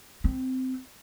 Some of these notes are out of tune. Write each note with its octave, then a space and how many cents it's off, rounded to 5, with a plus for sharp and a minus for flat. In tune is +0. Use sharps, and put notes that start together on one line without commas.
C4 -15